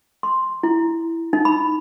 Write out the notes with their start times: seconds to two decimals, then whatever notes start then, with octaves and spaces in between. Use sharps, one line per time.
0.23 C6
0.63 E4
1.33 D#4
1.45 B5